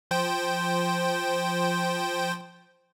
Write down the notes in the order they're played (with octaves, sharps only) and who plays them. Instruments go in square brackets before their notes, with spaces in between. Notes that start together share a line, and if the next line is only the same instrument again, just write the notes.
[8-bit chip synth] F3 C5 G5